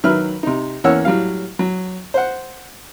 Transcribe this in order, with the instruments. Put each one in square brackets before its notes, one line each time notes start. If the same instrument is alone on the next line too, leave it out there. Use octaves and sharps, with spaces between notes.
[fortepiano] D#3 F#3 B4 E5 B5 F6
C3 D#4
E2 A#3 C#4 C#5 F#5 E6
A2 F#3 G3 F5
F#3
C5 F#5